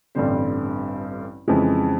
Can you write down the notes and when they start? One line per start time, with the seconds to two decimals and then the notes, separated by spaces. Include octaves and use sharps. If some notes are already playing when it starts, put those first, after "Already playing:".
0.15 A1 G2 D3 G3 C4
1.48 F2 C#3 E3 G#3